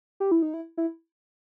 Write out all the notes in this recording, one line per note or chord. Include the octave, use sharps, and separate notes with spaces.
G4
E4
D#4
E4
E4